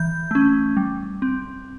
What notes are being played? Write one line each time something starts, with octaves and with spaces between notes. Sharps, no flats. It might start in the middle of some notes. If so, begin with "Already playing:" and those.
Already playing: E3 G6
A3 C#4
G3
C4